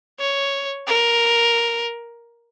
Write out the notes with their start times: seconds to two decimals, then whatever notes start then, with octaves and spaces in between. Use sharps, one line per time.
0.19 C#5
0.87 A#4